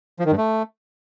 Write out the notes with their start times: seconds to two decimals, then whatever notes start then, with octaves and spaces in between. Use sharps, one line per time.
0.19 F3
0.25 D#3
0.32 G2
0.38 A3